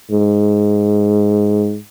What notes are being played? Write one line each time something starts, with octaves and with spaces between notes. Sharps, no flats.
G#2